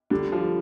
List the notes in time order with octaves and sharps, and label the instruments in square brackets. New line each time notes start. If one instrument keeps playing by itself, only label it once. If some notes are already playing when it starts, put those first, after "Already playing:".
[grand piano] D3 [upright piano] G3
[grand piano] F3